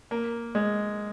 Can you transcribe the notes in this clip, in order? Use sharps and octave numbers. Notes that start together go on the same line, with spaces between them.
A#3
G#3